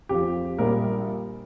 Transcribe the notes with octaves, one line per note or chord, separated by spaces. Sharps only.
F2 F3 G4
A#1 A#2 G3 A#4